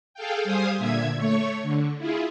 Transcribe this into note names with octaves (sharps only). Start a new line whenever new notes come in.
G#4 A4 F5 G5
G3 C5 F5 G#5 D#6
A#2 D3 E5 G#6
A3 C#5 C#6
D3
E4 F4 G#4